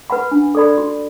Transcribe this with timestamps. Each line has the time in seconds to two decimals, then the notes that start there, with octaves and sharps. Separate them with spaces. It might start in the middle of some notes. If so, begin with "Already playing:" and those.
0.10 B4 F#5 B5
0.31 D4
0.55 A4 D5 B5
0.78 F#4